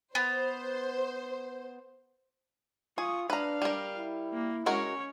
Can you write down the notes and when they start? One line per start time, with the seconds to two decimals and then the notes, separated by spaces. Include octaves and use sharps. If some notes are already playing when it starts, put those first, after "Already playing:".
0.15 B3 C5
2.98 F4 G#4 C#6 D#6
3.30 D4 B4 F5 A#5
3.62 G3 A#4
3.97 E4
4.34 A#3
4.66 G#3 C#4 F#4 A#4 C#5